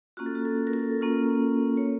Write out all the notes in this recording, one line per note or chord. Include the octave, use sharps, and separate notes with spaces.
A#3 C#4 F4 F#4
A4
F#4
A4
A#4
A4
A#3 C#4 F4
C#5